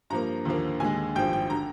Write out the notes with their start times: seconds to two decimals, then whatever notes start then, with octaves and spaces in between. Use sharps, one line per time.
0.10 G2 F3 A#3 A#5
0.45 D#2 D3 F3 A#3
0.80 D#2 D3 G#3 G#5
1.15 G#1 G2 F3 G5
1.33 G5
1.50 D3 A#5